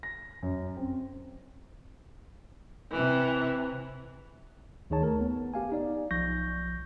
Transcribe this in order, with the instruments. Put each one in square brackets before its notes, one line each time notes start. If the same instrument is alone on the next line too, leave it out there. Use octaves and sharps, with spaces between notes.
[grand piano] A#6
F#2
C4
[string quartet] C3 E3
[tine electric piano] D2 D#3 D#4 G#4 C#5 A5
A3 A#4
B3
B3 G4 F5 G#5
D#4 D5
B1 F3 C#6 G6 A#6